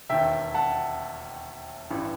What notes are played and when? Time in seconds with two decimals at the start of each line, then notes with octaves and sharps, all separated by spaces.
0.09 E1 D#2 D#3 E5 G5
0.54 F#5 A5
1.90 A1 G2 E3